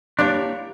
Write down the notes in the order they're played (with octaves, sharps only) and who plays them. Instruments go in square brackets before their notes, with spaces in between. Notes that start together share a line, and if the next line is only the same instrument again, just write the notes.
[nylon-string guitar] A#3 E4 G4 A#4 C#5 [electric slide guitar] D4